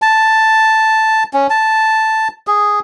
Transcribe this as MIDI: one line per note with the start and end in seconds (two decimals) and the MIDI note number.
0.02 1.24 81
1.33 1.47 61
1.50 2.28 81
2.47 2.80 68